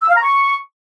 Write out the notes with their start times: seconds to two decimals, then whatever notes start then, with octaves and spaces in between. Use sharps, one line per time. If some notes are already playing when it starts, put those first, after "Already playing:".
0.02 E6
0.09 F5
0.16 A#5
0.23 C#6